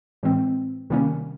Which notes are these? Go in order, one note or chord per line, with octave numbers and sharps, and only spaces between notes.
A2 E3 G#3 C4
C3 D#3 G3 A#3 C#4